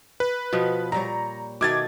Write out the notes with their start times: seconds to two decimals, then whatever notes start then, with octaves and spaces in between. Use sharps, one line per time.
0.20 B4
0.53 B2 F3 B3
0.92 A#2 G3 C#5 A#5
1.61 B2 D#3 A3 D6 G#6 A6